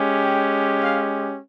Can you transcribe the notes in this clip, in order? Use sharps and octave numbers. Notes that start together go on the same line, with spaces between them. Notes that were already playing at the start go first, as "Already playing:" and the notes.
Already playing: G#3 C#4 G4
G5
F5